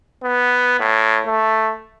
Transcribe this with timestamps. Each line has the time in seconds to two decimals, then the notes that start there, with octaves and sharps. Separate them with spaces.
0.23 B3
0.80 A2
1.26 A3